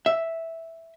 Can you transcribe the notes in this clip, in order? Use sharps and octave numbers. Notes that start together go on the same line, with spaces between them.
E5